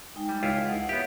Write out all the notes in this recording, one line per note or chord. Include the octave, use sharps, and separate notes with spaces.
G#3 D#4 G5
G3
C#2 E4 F4
F#5 D#6
B3 G4 C#5 E5